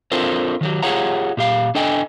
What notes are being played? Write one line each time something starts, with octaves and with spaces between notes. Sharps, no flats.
C4 D4 F4 A4 A#4 C5
D#3 F#3 G4
F4 G4 G#4 C#5 F#5 A#5
A#2 G4 F5
D4 A4 D#5 G5 G#5